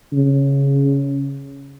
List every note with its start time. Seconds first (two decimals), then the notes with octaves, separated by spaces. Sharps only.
0.13 C#3